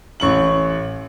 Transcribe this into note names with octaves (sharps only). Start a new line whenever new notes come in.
A1 C#6 F#7